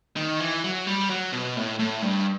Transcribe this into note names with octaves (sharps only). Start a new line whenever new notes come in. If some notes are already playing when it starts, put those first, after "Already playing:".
D#3
E3
F#3
G3
F#3
B2
A2
A2
G2